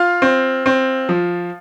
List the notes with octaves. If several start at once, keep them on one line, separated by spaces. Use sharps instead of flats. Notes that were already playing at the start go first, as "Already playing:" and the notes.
Already playing: F4 F5
C4
C4
F3